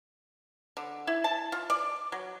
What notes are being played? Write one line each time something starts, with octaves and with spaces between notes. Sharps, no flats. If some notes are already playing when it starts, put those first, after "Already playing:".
D3
E4
A5
F4
D5
F#3